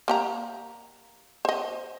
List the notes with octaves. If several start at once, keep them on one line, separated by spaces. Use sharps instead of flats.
A#3 G4 A#5
C5 D#5